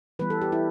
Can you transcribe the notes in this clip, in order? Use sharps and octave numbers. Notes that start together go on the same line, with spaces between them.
E3 G3 B3 B4
A4
G4
E4